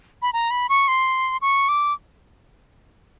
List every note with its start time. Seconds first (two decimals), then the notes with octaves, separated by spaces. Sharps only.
0.22 B5
0.33 A#5
0.51 B5
0.69 C#6
0.88 C6
1.42 C#6
1.69 D6